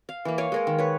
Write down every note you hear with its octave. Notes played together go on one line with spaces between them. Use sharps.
F5
E3 A#3
C#5 F5 G#5
G#3 A#4 C#5
D#3
B4 C#5